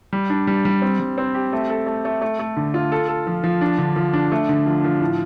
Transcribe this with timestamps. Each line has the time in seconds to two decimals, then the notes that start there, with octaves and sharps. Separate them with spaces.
0.13 G3
0.30 D4
0.47 G3
0.65 G3
0.82 C4
1.00 G3
1.18 C4
1.34 G4
1.53 A3
1.70 A4
1.86 A3
2.05 A3
2.22 A3
2.39 A3
2.57 D3
2.74 F4
2.92 A4
3.09 A4
3.27 F3
3.44 F3
3.61 D4
3.78 D3
3.96 F3
4.13 D4
4.32 A3
4.49 D3
4.66 F3
4.84 F3
5.01 A2